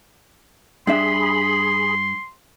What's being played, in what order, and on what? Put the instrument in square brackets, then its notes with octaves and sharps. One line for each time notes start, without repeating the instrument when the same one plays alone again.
[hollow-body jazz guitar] G2 D4 E5 [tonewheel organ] G#4 B5 [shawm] C6